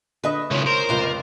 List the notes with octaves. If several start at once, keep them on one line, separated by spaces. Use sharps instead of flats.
D3 B4 D#5 E5 C#6 D#6
C#2 D3 F3 E4 C#5
A#4 C5
F1 C#2 F4 D5